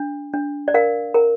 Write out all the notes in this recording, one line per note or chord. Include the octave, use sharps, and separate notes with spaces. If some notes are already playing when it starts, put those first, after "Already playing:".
Already playing: D4
D4
D5
A#4 F5
A#4